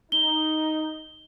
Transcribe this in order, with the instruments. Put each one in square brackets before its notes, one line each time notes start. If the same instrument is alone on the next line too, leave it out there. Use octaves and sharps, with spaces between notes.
[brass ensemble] D#4 [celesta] G7